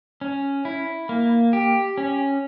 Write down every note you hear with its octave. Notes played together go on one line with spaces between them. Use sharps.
C#4
E4
A#3
G4
C#4